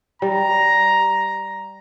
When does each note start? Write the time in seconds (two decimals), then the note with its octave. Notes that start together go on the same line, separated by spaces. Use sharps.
0.22 G3 A#5